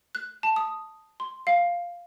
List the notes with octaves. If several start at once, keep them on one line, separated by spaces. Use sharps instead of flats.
F#6
A5
D#6
C6
F5